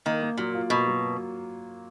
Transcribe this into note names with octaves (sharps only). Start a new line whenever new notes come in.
D#3 A#3
A#3
A#2 F#3
F4
B2 A#3
F#3